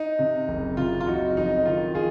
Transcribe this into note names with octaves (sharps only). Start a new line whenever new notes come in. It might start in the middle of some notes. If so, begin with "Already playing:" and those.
Already playing: D#4
C3
F#1
C3 F4
F4
F#1 D#4 F#4
F2 D#4
D#3 F4
F4 G#4